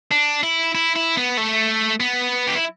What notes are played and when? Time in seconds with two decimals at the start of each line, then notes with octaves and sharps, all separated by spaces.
0.12 D4
0.44 E4
0.75 E4
0.96 E4
1.17 B3
1.38 A3
2.00 B3
2.47 G4
2.55 E4